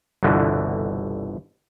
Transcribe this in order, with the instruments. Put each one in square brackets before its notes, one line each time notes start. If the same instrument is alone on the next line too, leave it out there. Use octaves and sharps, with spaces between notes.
[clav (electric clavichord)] G1 C2 B2 D3 E3